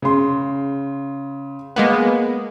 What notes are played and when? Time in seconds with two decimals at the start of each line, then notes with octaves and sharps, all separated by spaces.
0.02 C#3 C6
1.76 G#3 A#3 B3